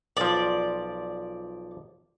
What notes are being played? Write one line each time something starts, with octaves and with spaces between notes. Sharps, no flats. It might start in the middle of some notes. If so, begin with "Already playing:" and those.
B1 F3 D5